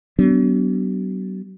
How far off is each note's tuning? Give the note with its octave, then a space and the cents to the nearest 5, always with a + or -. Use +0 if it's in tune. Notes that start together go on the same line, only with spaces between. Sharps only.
F#3 +45 B3 +10 D4 -20